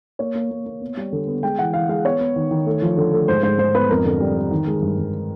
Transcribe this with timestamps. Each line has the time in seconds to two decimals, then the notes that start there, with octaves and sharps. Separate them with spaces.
0.19 A#3 C#5
0.35 A#3
0.51 A#3
0.66 A#3
0.81 B3
0.97 G3
1.12 D3
1.27 B3
1.43 G#3 G5
1.59 E3 F#5
1.74 E3 F5
1.89 G#3 F5
2.05 B3 C#5
2.20 B3
2.36 D#3
2.51 D#3
2.66 A3
2.82 F3
2.97 D3
3.13 A3
3.28 G#2 C5
3.43 G#2 C5
3.59 G#2 C5
3.74 B3 B4
3.90 F2 A#4
4.05 D3
4.20 G3
4.36 D3
4.51 D#3
4.67 G#3
4.82 G2
4.98 G2